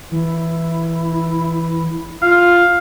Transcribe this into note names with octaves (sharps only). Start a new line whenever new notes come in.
E3 E4
F4 F5